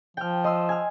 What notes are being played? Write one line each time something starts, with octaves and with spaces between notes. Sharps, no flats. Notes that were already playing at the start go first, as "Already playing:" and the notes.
F3 G5 F6
D#5 C6 E6
G#5 F6